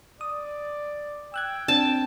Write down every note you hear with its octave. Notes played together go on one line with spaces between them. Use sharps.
D5 D#6
G5 E6 F#6 G#6
C4 D4 A5